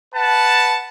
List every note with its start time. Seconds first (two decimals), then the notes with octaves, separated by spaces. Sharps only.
0.15 B4 F#5 A5